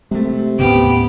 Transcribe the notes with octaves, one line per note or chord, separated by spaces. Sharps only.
C3 G#3 A3
D#2 A2 C#3 B3 G4